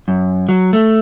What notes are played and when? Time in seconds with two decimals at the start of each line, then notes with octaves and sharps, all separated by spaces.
0.08 F#2
0.49 F#3
0.73 A3